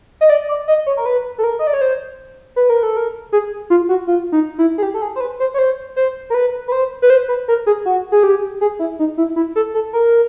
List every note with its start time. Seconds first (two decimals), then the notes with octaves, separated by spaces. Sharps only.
0.21 D#5
0.30 D5
0.49 D5
0.68 D#5
0.86 C#5
0.97 A#4
1.06 B4
1.38 A4
1.44 A#4
1.59 D#5
1.67 D5
1.74 C#5
1.81 C5
2.56 B4
2.70 A#4
2.83 A4
2.97 A#4
3.32 G#4
3.70 F4
3.89 F#4
4.07 F4
4.32 D#4
4.58 E4
4.78 G#4
4.83 G4
4.94 A4
5.02 G#4
5.16 C5
5.20 B4
5.40 C5
5.54 C#5
5.58 C5
5.96 C5
6.30 A#4
6.34 B4
6.68 B4
6.72 C5
7.02 B4
7.10 C5
7.29 B4
7.48 A#4
7.66 G#4
7.85 F#4
8.12 G#4
8.23 G4
8.61 G#4
8.79 E4
8.99 D#4
9.18 E4
9.36 E4
9.56 A4
9.74 A4
9.93 A#4